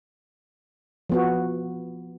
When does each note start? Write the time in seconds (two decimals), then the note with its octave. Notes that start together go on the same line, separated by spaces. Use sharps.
1.10 F3 B3 F#4